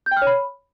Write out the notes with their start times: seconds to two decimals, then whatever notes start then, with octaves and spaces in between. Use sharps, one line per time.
0.06 G6
0.11 G5
0.17 F6
0.22 C#5
0.27 B5